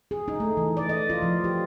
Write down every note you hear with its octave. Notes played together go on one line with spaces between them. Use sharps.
G#4
D#4
A3
E3
D5
D#5
F4
F3
G4